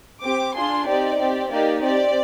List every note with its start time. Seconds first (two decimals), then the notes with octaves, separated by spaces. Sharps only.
0.21 C4 G4 D6
0.54 D4 F4 G#4 C6
0.86 C4 D#4 G4 D5
1.19 C4 G4
1.51 A#3 D#4 G4 D5
1.82 C4 G4 D5